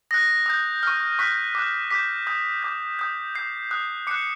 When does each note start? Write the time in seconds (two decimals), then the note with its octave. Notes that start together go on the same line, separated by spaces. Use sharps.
0.11 D#6 F#6 A#6
0.46 D#6 G6
0.83 C#6 F6
1.19 C#6 F#6 B6
1.55 D6 F#6
1.90 D6 G6 B6
2.27 D#6 G6
2.63 D6 G6
2.99 D#6 G6
3.35 D#6 G6 C7
3.71 D#6 F#6
4.07 D6 F#6 C#7